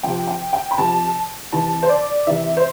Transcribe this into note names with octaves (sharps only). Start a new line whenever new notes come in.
C3 F3 G5
G5
G5
B5
C3 F3 A5
C3 E3 A5
C5
D5
C3 E3 E5
C5